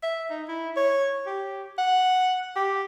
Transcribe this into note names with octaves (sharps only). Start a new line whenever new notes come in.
E5
D#4
E4
C#5
G4
F#5
G4